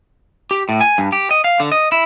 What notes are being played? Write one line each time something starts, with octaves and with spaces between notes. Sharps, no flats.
G4
A2
G#5
G2
G4
D#5
F5
D3
D#5
E4